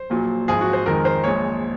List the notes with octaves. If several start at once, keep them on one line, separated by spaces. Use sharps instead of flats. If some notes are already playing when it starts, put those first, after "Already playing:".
Already playing: C5
A#1 A#2 F#3
G#1 G#2 F3 G#3 G#4
F#4
C5
F2 D#3 G#3 A#4
C5
A#1 A#2 G#3 C#5